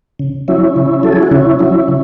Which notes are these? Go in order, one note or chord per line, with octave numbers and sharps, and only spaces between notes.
C#3
F#3 C#4 E4
C#3
F#3 A4
G#4
F#4
C#3 C#4 E4
F#3 C#4 E4
C#3